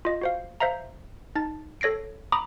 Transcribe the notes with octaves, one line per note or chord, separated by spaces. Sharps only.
F4 D#5
F#4 C5 F5
C5 E5 F5 A#5
D#4 A5 A6
A4 C#5 A#6 C7 D7
A#5 B5 D6 D#6